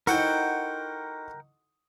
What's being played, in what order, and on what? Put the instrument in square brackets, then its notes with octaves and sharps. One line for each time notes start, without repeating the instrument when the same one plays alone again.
[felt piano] D#4 E4 [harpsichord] F#4 A4 C5 [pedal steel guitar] A#4 F#5 G5